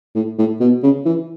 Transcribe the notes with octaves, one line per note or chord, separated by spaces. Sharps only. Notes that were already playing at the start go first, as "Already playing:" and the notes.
A2
A2
B2
C#3
E3